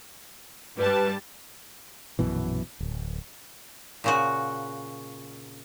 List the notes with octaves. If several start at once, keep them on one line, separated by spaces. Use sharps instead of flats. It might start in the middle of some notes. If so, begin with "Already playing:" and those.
G2 G3 B4 A5
A#1 F#2 B2 E3
D1
A#2 C#3 F#4